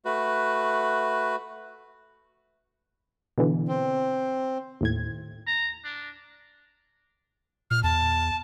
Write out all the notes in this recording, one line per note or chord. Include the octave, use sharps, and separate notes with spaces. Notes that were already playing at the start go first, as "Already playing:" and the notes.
A3 F#4 B4
B2 D3 E3
C4
D#2 A2 G#6
A#5
D4
A#2 F6
E2 A5